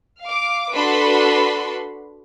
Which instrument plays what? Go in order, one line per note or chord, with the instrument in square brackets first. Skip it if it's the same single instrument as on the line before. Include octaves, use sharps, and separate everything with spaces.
[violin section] F5 D6
D4 F#4 A4 B4 B5 C6